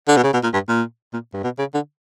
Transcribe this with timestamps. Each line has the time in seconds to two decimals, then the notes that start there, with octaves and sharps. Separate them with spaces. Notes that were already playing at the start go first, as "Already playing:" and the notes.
0.08 D3
0.17 B2
0.24 C#3
0.34 B2
0.43 A#2
0.54 G2
0.68 A#2
1.13 A#2
1.34 G2
1.44 B2
1.59 C#3
1.74 D3